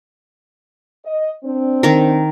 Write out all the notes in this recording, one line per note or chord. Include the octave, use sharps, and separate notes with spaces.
D#5
C4 D4
D#3 A#4